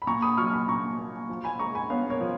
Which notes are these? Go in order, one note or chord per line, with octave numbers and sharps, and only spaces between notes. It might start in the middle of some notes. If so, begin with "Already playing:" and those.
B5
A#2 A#5 C#6
B5 D#6
F#3 C#6 F6
B5 D#6
A#2 A#5 C#6
A#3
F3
G#5 B5
G#3 A#5 C#6
G#5 B5
B3 C#5 F5
A#4 C#5
F3